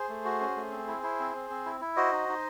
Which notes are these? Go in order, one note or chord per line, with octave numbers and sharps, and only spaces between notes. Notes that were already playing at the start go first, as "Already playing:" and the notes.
Already playing: G#4 C5
A3
F#4
C#4
A3
C4
E4
E4
C4
C4
C4
E4
E4
F#4 C5 D#5
D#4
D#4